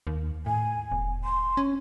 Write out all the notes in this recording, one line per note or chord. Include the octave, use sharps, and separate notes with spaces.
D#2
A2 G#5
E1
C6
C#4